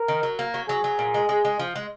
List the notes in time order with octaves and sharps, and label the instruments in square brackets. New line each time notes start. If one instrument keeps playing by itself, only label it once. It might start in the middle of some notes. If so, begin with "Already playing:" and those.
Already playing: [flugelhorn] A#4
[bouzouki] D#3
F#3
A#3
F#3
[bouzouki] F#3 [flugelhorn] G#4
[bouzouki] F#3
A#2
G#3
G#3
G#3
F3
G#3